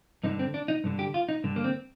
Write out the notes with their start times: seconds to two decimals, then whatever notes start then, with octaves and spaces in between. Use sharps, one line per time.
0.24 G2 D3 D#4
0.39 C4
0.54 D4
0.68 D#4
0.84 G2 D3
0.99 G4
1.14 F4
1.29 D#4
1.44 G2 D3
1.56 A#3
1.64 C4